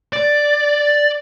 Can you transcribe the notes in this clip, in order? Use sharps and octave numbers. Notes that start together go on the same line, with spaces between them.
D5